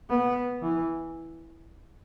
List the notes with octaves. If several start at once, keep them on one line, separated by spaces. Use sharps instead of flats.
B3
E3